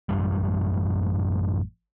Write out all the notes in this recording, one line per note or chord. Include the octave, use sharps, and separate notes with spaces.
A1 F#2 G3